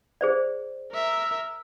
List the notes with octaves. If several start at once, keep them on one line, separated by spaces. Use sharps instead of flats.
G#4 C5 D5
A#4 E5